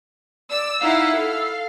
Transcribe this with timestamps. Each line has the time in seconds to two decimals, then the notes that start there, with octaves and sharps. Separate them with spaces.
0.50 D5 E6
0.82 D#4 E4 F5 F#5 E6
1.17 A4 F5